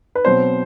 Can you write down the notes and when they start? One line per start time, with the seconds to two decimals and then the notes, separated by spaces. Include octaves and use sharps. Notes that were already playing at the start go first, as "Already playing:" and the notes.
0.15 B4
0.25 B2 F#3 C4 C5